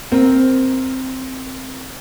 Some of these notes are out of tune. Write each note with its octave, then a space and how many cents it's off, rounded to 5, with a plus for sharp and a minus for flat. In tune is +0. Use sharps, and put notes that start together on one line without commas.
C4 +0 A#4 +0